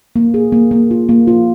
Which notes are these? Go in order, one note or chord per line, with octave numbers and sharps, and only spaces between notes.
A#3
G#4
A#3
A#3
F4
A#3
F4